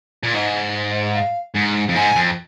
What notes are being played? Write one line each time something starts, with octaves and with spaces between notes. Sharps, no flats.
A#2
G#2 D#5
F5
G#2
F2
G#2 G#5
F2